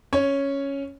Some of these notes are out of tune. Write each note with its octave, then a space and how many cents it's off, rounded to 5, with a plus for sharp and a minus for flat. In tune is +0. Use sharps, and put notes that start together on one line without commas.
C#4 +0 C#5 +0